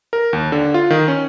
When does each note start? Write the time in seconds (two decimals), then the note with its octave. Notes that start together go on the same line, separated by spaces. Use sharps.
0.13 A#4
0.33 D#2
0.52 D3
0.74 F4
0.90 D#3
1.08 C#4